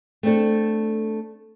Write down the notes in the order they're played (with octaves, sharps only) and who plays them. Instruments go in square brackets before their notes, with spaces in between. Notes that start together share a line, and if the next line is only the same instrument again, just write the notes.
[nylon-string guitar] A3 C4 D4 A4